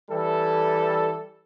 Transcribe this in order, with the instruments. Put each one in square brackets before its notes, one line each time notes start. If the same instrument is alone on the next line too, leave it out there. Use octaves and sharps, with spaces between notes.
[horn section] E3 G3 A4